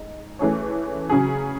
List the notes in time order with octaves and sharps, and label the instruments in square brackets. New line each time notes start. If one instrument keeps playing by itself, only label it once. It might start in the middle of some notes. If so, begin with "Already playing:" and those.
Already playing: [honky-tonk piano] G#3 D#4
E3 A3 C#4 G#4 C#5
C#3 F#3 C#4 G#4